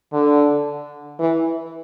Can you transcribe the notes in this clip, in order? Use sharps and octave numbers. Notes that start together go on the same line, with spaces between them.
D3
E3